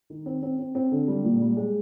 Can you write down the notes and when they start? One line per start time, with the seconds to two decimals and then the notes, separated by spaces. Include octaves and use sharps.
0.10 D#3
0.26 C4
0.43 C4
0.59 C4
0.75 C4
0.91 D3
1.08 G3
1.24 A#2
1.41 G3
1.57 G#3